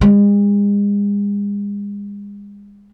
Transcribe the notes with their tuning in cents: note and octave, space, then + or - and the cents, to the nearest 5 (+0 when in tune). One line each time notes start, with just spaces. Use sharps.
G#3 -40